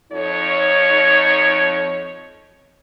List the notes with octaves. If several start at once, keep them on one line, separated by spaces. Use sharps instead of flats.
F2 D#4 C#5